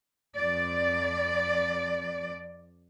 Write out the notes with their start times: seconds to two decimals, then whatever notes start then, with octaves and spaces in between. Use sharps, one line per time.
0.36 F2 D5